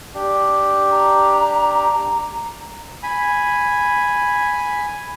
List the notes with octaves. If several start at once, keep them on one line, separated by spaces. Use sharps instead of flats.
D4 G4
A#5
G#5 B5